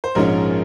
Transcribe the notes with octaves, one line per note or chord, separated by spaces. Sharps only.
C5
A#1 G#2 F3 G#3 C#4 A#4